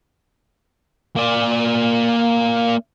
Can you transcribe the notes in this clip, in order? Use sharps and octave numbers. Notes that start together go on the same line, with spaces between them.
A#3 D5